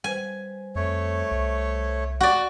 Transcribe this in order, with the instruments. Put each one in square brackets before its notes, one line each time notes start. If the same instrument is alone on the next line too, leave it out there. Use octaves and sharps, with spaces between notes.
[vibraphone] G3 B4 C5 [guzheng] G#5
[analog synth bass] F2 [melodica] A3 C#5
[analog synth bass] C2
[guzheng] F#4 D5